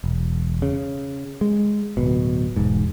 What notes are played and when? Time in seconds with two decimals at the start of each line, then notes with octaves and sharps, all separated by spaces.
0.04 E1
0.62 C#3
1.41 G#3
1.97 D1 G1 B2
2.56 E1 G#2